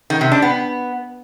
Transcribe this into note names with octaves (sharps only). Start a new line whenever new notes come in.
D#3
C3
D4
B3